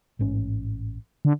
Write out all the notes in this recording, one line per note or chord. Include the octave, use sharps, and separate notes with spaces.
A1 G#2 C#4
D3